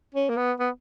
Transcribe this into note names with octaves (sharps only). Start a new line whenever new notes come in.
C#4
A#3
B3
B3